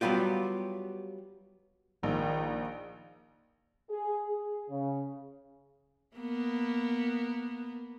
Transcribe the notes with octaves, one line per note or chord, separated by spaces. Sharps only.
F#3 G3 B3 F4 G4
A#1 D#3
G#4
G#4
C#3
A#3 B3